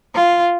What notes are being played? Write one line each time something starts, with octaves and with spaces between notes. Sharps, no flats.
F4